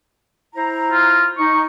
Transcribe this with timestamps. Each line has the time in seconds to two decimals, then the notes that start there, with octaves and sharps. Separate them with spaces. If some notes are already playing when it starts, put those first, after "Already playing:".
0.55 E4 C5 A#5
0.92 F4
1.38 D#4 C#6